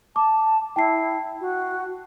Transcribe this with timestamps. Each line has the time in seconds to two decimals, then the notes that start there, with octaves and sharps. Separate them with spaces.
0.16 A5 D6
0.76 E4 G5 A5 C7
1.41 F#4